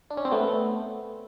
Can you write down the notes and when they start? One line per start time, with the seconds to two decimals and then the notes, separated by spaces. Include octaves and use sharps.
0.10 D4
0.17 C#4
0.25 C4
0.32 A3 B3